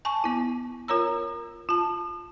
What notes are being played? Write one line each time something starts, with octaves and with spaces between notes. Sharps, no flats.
G#5 A5 C#6
B3 E4
F4 A#4 C#5 A#5 E6
F4 A5